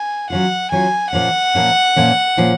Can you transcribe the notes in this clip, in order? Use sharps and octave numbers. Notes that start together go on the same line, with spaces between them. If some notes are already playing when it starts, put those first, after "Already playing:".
Already playing: G#5
F#3 C#4 F4 F#5
F#3 C#4 F4 G#5
A#2 F3 A#3 C#4 F#5
A#2 F3 A#3 C#4
A#2 F3 A#3 C#4
A#2 F3 A#3 C#4